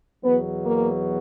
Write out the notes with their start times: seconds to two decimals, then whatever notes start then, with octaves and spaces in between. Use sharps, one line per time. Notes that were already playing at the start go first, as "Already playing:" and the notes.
0.23 E2 B2 F#3 B3
0.64 A#3